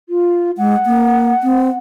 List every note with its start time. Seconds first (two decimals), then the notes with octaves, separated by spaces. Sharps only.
0.09 F4
0.58 G#3 F#5
0.86 A#3
1.43 C4